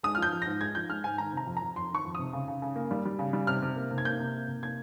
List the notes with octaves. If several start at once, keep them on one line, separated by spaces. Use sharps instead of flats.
G#3 D#6
F6
F3
G6
F3
G#2 A#6
G#3 G#6
F3 G6
G#3 F6
G#2 G#5
D#3 A#5
C3 A#5
F2
A#5
F2
F2 C6
D#3 C#6
F2
C3 D#6
C#3
C#3
C#3
A#3
G3
G3
C#3
G3
C3 F6
C3
A#3
C3
G#6
A#3 G6
C3
A#3
C3
A#3 G#6